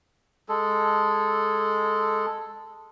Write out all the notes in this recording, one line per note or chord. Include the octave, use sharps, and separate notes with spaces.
G#3 A4